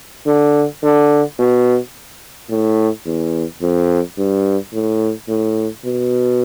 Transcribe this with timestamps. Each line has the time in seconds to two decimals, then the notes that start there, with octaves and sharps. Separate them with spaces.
0.26 D3
0.83 D3
1.39 B2
2.50 A2
3.06 E2
3.62 F2
4.18 G2
4.73 A2
5.29 A2
5.84 B2